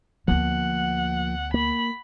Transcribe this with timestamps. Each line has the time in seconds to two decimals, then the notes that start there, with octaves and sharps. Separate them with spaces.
0.28 D2 F3 A#3 B3 F#5
1.54 A#3 B5